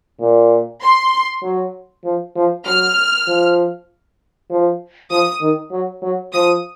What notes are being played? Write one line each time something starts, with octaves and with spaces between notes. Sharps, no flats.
A#2
C6
F#3
F3
F3
F#3 F6
F3
F3
F3 D#6
D#3
F#3
F#3
F3 D#6